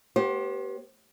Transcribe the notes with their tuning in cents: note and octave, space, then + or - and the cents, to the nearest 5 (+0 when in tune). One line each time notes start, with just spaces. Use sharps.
B3 -30 G4 -25 C5 +30